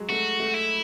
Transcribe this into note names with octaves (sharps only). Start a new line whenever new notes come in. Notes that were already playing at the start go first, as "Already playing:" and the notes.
Already playing: F#3 G#3
A3 F#4
A3
E4